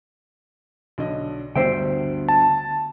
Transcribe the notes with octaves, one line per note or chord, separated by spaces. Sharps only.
B1 D3 D#5
D2 G2 D3 B3 D4 C5 E5 G5
A5